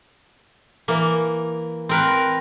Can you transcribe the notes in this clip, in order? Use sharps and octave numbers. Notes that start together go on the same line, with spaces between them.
E3 A#3
C4 A#4 B4